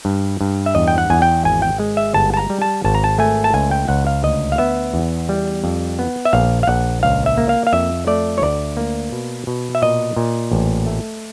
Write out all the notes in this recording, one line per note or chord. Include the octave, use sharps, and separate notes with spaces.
G2
G2
E5
E2 D#5
G5
F#5
E2 G#5
G5
G#1 G#5
G5
G#3
E5
G1 A5
A5
A#5
G3
A5
G#1 A5
A#5
A5
A3 G#5
A5
C#2 G#5
G5
C#2 F#5
F5
D2 D#5
F5
B3 E5
E2
G3
F2
B3
E5
A#1 F5
F5
A#1 F#5
C#2 F5
E5
A#3
F5
F5
F2 E5
A3 D5
C#5
D2 D5
A#3
B2
B2
E5
A#2 D#5
A#2
A1
A3